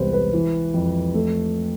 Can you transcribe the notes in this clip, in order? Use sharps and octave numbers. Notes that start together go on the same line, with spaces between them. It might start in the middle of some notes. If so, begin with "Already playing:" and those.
Already playing: E1 C2 B3 B4 C5
B4
E3
F2
A3